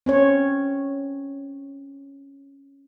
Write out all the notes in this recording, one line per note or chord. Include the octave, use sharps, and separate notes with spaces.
C4 C#4 C#5